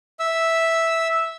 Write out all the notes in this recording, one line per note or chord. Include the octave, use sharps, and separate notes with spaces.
E5 E6